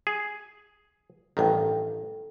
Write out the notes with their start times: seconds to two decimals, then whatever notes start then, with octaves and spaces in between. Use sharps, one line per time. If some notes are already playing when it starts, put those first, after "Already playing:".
0.07 G#4
1.37 A1 G2 D#3 A4 G5